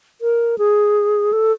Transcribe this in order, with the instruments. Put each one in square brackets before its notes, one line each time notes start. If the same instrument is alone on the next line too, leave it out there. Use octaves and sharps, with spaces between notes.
[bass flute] A#4
G#4
A4